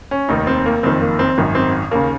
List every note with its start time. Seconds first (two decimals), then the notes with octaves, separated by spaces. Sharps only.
0.11 C#4
0.29 F1 D#2 D#3 D#4
0.47 C4
0.66 A#3
0.83 F#1 F2 D#3 C4
1.01 A#3
1.19 C4
1.38 G#1 F#2 D#3
1.55 C4
1.91 D#2 C#3 A#3